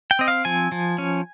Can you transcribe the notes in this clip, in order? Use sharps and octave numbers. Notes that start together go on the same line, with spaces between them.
G5
C4 D#5
F5
F3 G#5
F3
C#4